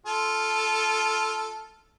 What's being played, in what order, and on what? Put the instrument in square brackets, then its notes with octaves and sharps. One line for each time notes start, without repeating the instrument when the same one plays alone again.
[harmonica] F4 A4